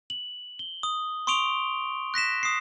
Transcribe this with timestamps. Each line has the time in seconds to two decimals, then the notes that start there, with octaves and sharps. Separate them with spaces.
0.10 F#7
0.59 G7
0.83 D#6
1.27 C6 C#6 D#6 D7 F7 G7
2.14 F#6 A#6 B6 E7
2.43 D#6 C7